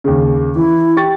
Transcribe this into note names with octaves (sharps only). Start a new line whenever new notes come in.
D#2 C#3
E3 E4
G4 C#6 A6